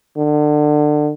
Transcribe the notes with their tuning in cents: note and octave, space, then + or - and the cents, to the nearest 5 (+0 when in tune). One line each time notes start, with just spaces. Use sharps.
D3 +25